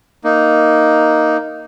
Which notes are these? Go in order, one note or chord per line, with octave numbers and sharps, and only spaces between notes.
A#3 D#4